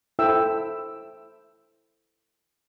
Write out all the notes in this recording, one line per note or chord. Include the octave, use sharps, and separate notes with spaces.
E4 A4 C5 E5 G5 E6